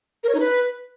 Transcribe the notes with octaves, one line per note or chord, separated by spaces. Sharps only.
A#4
C#5
D#4
B4